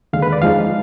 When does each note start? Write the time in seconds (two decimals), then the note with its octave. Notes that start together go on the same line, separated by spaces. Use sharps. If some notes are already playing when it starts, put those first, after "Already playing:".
0.13 D#2 D3 G#3 F5
0.22 B4
0.33 D5
0.41 F2 F3 G#3 D#4 F5